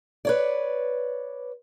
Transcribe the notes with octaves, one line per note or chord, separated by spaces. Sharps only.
B4 C#5 D5